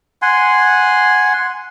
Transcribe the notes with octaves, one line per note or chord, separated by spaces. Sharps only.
F#5 G#5 C6